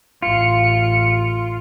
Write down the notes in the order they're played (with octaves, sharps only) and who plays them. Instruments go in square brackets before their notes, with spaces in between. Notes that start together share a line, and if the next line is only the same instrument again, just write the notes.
[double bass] A1 [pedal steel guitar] F4 [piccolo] C#7